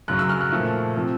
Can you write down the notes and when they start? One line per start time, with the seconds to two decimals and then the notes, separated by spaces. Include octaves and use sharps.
0.08 F#2 C#3 F#3 F#6
0.19 E6
0.29 F6
0.41 F#6
0.51 A#2 F3 A3
0.96 C3 F3